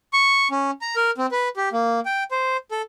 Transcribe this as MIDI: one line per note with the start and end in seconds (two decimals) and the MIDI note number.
0.13 0.48 85
0.51 0.71 61
0.81 0.96 82
0.96 1.11 70
1.18 1.26 60
1.32 1.49 71
1.57 1.69 67
1.72 2.00 58
2.05 2.23 79
2.31 2.57 72
2.71 2.82 69